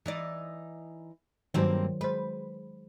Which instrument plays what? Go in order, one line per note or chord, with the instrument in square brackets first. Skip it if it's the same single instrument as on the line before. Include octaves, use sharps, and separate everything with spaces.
[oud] E3 D#4 D5
[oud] G2 A#3 C4 [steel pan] D#3 F#3 C5
[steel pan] G#3 C5 [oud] B4